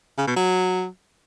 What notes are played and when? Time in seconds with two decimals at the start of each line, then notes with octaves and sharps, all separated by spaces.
0.18 C#3
0.27 B2
0.37 F#3